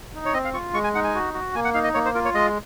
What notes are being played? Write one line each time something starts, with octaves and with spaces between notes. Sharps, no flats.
D#4
C#5
C4 D#5
F5
F4 C#6
G#3 C#6
G#5
D#4 F#5
G#5
F#4
F#4
A#3 G#5
F#5
D#4 F5
D#5
A#3 C#5
C5
F4 A#4
C#5
G#3 D#5